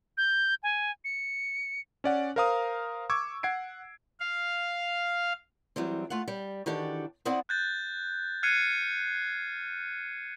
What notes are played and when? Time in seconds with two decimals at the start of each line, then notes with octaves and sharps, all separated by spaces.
0.17 G6
0.63 G#5
1.05 C#7
2.04 C#4 D5 F#5
2.36 A#4 C5 F5 A#5 D#6
3.10 C#6 D6 E6 G#6
3.43 F#5 G#6 C7 D7
4.20 F5
5.76 E3 F#3 G3 C4
6.10 A3 F4 F5 F#5
6.28 G3
6.66 D#3 E3 D4 F#4 G4 A4
7.25 B3 C4 E4 G#4 D5 F#5
7.49 F#6 G6 A6
8.43 F6 F#6 G#6 C7 C#7 D#7